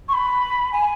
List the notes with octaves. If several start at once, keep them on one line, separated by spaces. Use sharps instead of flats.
C#6
B5
G#5